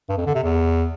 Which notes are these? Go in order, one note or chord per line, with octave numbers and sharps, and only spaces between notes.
G2
F2
D3
C3
E2